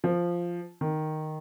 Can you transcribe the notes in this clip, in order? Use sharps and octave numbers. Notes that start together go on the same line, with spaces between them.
F3
D#3